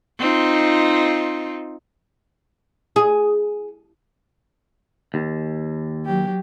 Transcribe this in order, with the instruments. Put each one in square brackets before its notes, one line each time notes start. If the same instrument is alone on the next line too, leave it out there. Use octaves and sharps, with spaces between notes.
[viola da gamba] C4 D#4 F4
[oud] G#4
[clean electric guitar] D#2
[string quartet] F#3 G4